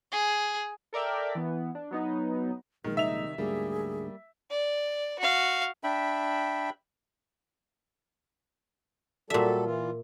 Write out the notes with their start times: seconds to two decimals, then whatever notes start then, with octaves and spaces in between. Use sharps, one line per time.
0.12 G#4
0.93 A4 A#4 D5 E5 G5
1.35 E3 B3
1.75 D4
1.91 F#3 B3 D#4
2.84 A#1 A#2 D#3 G#3 A#4
2.97 C3 D#3 G3 D#4 E5 F7
3.38 D2 G#2 G3 G#3 A#3 G#4
4.50 D5
5.19 F#4 F5
5.84 D4 E5 G5 B5
9.30 A#2 F#3 G3 A4 E5
9.65 E3 F4